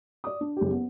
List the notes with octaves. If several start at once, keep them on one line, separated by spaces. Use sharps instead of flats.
D5 D#6
D4
F#1 G4
B3